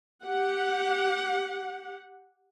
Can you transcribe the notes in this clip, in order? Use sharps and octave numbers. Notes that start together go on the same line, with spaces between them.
G4 F#5